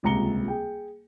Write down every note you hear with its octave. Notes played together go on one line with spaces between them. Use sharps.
D#1 C#2 C3 A#5 C#7 G7
G#4 G5